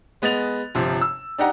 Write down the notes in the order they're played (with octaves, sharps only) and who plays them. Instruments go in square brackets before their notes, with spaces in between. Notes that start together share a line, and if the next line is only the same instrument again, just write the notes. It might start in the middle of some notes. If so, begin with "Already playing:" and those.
[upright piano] G#3 B3 D#5 F#6 A6 F7
G1 C3 F3
E6
D4 D#4 G4 F#5 A#5